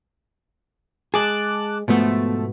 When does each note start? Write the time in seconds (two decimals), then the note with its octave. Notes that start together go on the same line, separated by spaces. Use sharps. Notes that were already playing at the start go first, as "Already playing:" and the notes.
1.14 G#3 G#4 A5 D6 F#6
1.88 G#2 B2 F3 A3 B3